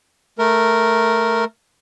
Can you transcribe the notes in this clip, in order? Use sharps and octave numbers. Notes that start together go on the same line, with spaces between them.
A3 A#4